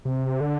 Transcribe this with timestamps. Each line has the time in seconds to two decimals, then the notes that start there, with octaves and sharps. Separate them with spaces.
0.05 C3
0.41 D3